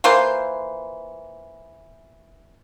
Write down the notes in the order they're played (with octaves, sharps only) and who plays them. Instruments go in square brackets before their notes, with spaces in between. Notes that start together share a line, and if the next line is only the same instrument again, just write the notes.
[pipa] E3 A#3 F4 C5